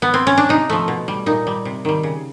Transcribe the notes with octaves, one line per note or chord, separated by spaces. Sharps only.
B3
C4
C#4
D4
C3 D#4
F3 A3
B2
G3
A#2 D#4
G3
C3
D#3 G3
C#3